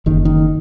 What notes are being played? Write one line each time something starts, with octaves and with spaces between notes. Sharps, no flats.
F#1 D#3
D#3